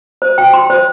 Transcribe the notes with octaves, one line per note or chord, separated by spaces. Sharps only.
C5
G5
C6
C5